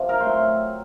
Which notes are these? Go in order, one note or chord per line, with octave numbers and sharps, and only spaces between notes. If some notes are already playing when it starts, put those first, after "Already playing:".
Already playing: C3 F3
A#4
A2 F#3 C4 C5